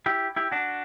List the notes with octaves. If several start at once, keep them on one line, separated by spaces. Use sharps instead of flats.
E4 G4
E4 G4
D4 F#4